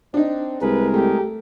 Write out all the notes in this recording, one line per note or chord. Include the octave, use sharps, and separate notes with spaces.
C4 D4 D#4
C2 G#3 G#4 A#4 B4
A3 G4